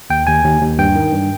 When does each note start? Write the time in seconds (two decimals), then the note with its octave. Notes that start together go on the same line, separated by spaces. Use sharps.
0.10 D#2 G5
0.27 D#2 G#5
0.44 D#2
0.61 D#2
0.78 G2 G5
0.95 D#3
1.12 G2